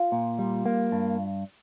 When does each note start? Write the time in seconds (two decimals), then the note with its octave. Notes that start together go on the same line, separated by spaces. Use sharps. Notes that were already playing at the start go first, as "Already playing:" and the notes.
Already playing: F4
0.12 A#2
0.39 G3
0.66 A#3
0.92 G2